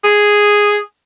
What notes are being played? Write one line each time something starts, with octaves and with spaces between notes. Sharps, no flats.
G#4